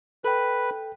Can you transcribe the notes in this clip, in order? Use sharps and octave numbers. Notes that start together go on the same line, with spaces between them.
A4 B4 G5